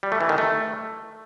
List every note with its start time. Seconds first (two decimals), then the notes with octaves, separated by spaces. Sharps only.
0.03 G3
0.12 A3
0.21 E3
0.29 D#3
0.38 A3